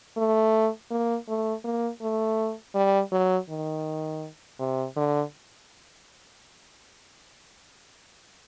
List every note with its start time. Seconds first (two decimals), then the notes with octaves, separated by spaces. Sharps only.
0.17 A3
0.91 A#3
1.28 A3
1.64 A#3
2.02 A3
2.75 G3
3.12 F#3
3.49 D#3
4.60 C3
4.96 D3